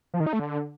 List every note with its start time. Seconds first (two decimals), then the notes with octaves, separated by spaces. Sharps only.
0.14 F3
0.20 D#3
0.26 D#4
0.33 A3
0.39 D3